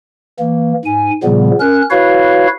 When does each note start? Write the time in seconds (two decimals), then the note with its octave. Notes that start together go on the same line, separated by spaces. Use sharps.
0.39 E3 A#3
0.85 G#2 G#5
1.23 A#2 C#3 F3 G3 B3
1.60 C#4 A#4 F#6
1.90 E4 F#4 B4 C#5 F5